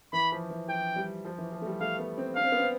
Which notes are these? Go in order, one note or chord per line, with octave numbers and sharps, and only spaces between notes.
E3 B5
F3
E3
F3 G5
G3
F3
E3
F3
A3
G3
A3 F5
B3
C4
D4 F5
C4
B3
C4